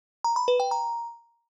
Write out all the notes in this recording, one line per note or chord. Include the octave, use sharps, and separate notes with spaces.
A#5
B5
B4
G5
A#5